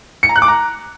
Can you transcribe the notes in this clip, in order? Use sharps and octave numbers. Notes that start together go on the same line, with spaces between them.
C#7
A#5
F#6
D6
A#5